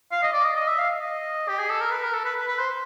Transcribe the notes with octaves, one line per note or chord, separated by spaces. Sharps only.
F5
D#5
D5
D#5
D#5
E5
F5
D#5
G4
G#4
A4
A#4
B4
A#4
A4
B4
B4
B4
C5